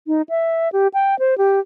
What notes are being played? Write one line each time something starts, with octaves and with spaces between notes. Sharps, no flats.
D#4
E5
G4
G5
C5
G4